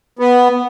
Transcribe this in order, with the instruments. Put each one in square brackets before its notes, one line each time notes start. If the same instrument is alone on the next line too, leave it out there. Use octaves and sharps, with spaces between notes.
[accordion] B3